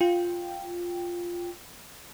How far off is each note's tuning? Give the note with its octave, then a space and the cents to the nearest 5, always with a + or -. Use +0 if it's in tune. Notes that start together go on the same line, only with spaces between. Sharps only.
F4 +0 G5 +0